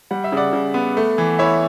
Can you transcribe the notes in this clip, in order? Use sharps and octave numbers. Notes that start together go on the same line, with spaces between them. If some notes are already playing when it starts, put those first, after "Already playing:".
G3 F#5
E5
C#3 D5 F#5
C#3
B3
A3
E3
E4 C#5 E5